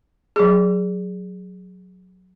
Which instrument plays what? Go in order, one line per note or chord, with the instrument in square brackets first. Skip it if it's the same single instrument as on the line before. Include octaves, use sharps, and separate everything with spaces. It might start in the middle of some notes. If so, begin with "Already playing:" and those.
[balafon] F#3 G#4